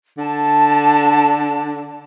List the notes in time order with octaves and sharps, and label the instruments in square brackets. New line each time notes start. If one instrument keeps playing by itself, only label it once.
[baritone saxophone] D3 [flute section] A5